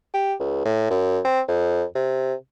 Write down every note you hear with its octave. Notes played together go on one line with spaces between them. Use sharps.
G4
C#2
A2
F#2
C4
F2
C3